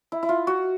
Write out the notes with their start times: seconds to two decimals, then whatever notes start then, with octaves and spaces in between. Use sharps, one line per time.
0.12 E4
0.23 E4
0.29 F4
0.47 F#4